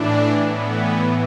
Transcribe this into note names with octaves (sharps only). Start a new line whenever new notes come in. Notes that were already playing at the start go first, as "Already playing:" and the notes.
Already playing: A2 E3 D4
A2 E3 B3